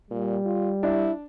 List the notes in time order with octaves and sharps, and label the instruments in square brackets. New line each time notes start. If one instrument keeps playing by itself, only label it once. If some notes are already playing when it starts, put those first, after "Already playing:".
[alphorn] A#2 [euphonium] G3
[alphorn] F4
[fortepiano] D4 [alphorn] E4